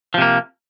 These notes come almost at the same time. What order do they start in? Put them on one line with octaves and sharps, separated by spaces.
F3 C3 A#3